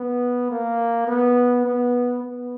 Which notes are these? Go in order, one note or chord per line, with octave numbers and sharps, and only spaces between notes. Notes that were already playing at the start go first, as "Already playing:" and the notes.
Already playing: B3
A#3
B3
B3
B3